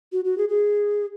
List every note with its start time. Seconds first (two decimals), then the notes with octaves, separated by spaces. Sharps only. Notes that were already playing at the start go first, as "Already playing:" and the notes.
0.12 F#4
0.24 F#4
0.37 G#4
0.49 G#4